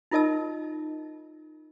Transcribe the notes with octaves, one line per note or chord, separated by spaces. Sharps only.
D#4 F4 A#4 D#5 A5 E6